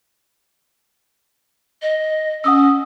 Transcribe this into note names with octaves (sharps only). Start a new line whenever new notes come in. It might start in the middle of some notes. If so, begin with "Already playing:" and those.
D#5
C#4 F#5 D#6 E6